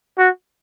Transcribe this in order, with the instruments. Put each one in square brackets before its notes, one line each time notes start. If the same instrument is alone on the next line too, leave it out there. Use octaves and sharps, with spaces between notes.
[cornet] F#4